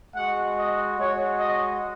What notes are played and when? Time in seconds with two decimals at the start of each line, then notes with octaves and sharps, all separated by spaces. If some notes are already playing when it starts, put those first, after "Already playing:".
0.14 G#3 F#4 F#5
0.57 D#5
0.98 G#3 F#4 C#5
1.40 D#5